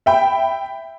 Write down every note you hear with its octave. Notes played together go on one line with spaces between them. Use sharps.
E5 G5 B5